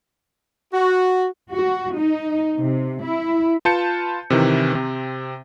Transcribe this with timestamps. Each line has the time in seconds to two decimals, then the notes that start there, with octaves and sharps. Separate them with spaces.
0.74 F#4
1.52 F#4
1.95 D#4
2.59 C3
3.03 E4
3.65 F4 B4 A5 G6 C#7
4.30 C3 D#3 E3
4.73 C3 C4